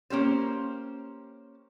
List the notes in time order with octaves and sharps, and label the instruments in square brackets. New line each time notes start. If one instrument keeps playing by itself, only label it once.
[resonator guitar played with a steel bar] A#3 C#4 G4 C5